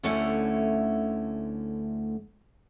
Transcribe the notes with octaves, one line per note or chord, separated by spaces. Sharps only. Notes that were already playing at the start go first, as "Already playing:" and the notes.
D2 D3 A3 C#4 E4 F#5